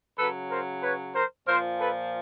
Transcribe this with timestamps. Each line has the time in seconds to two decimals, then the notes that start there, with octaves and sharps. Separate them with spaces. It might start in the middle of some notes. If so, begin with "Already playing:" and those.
0.18 C#3 F#3 A4 B4
0.50 A#4 C5
0.83 B4 C#5
1.14 A#4 C5
1.47 A#2 F3 A#4 C5
1.79 A4 B4